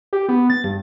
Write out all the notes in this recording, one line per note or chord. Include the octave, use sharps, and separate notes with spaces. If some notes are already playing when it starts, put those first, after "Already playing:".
G4
B3
A6
G2